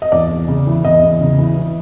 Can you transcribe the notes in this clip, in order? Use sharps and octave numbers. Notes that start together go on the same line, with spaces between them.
D#5
E2 D5
E2
C#3
E3
E2 D#5
E2
C#3
E3
E3